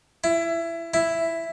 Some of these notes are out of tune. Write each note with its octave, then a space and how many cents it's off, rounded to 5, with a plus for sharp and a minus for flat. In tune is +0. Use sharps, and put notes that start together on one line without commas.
E4 +20
E4 +5